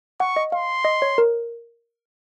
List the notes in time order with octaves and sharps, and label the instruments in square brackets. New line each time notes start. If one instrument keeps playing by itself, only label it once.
[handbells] F#5 [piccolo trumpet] C#6
[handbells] D#5
[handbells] F5 [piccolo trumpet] C6
[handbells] D#5
C#5
A#4